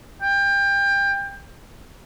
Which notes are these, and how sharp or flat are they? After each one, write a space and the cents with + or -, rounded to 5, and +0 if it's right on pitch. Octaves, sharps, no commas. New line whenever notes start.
G5 +25